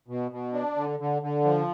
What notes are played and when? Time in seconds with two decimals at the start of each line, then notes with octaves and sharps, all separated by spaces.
0.08 B2
0.31 B2
0.54 D4
0.76 D3
1.00 D3
1.22 D3
1.44 F3